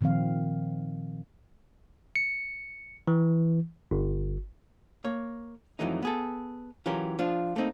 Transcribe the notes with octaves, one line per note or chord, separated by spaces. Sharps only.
A#2 D#3 F3 C4 F5
C#7
E3
G1
A#3 C#5
F2 G#2 E3 F#3 A3 D#4
B3 G#4 A4
E3 F#3 C#4 F4 G4 A#4
F3 D4 F4
A3 A#3 C4 D#4